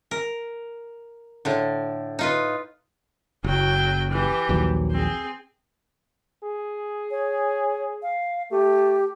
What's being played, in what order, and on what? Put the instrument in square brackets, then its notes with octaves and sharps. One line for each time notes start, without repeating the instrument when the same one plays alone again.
[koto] A#4
A2 D3
D#4 F4 B4
[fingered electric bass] F#1 [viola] F#3 G5
[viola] E3 G4
[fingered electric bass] A#1 D#2 F#3
[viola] C4 G#4
[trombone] G#4
[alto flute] C#5
F5
[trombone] A3 [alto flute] G4